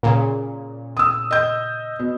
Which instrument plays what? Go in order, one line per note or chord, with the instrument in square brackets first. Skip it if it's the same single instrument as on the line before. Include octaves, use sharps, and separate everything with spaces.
[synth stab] A#2 C#3
[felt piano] D#6 E6
D#5 G6
B2